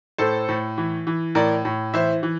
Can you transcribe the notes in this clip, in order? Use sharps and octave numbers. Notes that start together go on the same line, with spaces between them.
A2 A4 C5
A2
E3
E3
A2 A#4 D5
A2
E3 C5 E5
E3